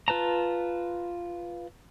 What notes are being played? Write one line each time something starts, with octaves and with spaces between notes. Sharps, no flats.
F4 B4 A5 A#5